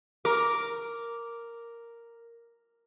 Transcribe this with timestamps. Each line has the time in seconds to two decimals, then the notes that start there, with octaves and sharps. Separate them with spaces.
0.25 A#4 D6